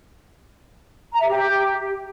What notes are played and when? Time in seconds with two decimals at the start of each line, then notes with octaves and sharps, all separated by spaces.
1.12 A#5
1.20 E5
1.28 G4